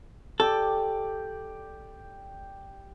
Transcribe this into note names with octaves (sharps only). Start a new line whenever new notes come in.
G4 A4 D5